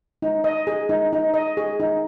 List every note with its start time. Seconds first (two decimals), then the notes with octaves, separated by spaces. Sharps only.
0.22 D#4
0.44 D#5
0.67 G#4
0.89 D#4
1.13 D#4
1.34 D#5
1.57 G#4
1.80 D#4